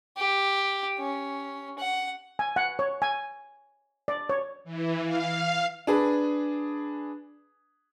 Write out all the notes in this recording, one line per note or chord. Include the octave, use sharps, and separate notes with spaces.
G4
C#4
F#5
G#5
F#5
C#5
G#5
D5
C#5
E3
F5
D4 G#4 B4